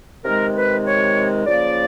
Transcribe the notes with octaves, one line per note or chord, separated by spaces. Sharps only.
C3 D#3 G#3 A#4
B4
C#5
C#3 F3 A#3 D5